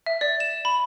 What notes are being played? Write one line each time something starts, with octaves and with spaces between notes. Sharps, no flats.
E5
D5
E7
B5